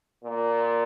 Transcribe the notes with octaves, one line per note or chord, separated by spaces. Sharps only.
A#2